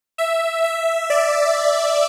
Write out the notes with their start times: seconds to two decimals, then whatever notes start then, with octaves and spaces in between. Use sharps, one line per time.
0.18 E5
0.64 E5
1.10 D5